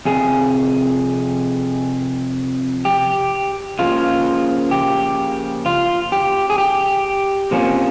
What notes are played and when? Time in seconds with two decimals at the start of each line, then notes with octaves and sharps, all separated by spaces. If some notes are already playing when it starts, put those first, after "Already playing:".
0.05 F2 C3 G#4
2.85 G4
3.79 C#3 F3 A#3 F4
4.71 G4
5.66 F4
6.12 G4
6.50 G#4
6.58 G4
7.51 C3 F3 A#3 C#4